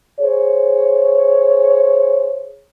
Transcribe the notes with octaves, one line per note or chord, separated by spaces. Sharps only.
G#4 C5 C#5